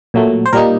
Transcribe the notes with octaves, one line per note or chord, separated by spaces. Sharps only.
A#2 F#3 A3
C5
A#2 G3 A#3 D#4 A#4